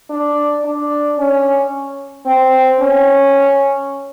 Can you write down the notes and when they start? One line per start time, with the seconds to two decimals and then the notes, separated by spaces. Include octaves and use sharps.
0.10 D4
0.65 D4
1.18 C#4
2.26 C4
2.80 C#4